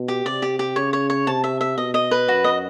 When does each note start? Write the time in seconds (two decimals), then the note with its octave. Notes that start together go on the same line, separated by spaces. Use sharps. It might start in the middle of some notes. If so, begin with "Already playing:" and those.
Already playing: B2
0.08 G4
0.25 C3 D5
0.42 G4
0.59 G4
0.76 C#3 C#5
0.93 C#5
1.10 C#5
1.27 C3 A5
1.44 E5
1.61 E5
1.78 B2 D#5
1.94 D#5
2.11 B4
2.28 F#2 F#4
2.44 D#5